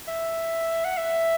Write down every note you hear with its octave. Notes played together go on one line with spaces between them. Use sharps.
E5
F#5
E5